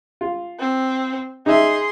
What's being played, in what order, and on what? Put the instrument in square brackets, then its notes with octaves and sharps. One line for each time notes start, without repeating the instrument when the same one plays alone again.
[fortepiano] F4
[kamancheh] C4
[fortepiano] D#4 E5 [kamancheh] G#4 C6